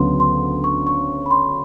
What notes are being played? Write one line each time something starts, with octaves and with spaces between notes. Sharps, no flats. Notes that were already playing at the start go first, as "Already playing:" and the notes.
Already playing: D2 C#3 F#3 B3 C6
C6
C#6
C#6
B5
C6